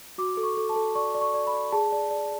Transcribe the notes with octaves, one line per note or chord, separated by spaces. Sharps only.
F#4 D6
A4
C#6
A4
A5
A4
D5 C#6
D5
C#6
D5
B5
D5
G#4 A5
D5
D5